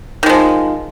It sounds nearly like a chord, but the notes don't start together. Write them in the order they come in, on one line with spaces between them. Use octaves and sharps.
D#3 G#3 F3